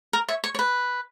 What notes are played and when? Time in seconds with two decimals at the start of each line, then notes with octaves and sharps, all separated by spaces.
0.13 A#4
0.28 C#5 E5
0.44 C#5
0.55 C#5
0.59 B4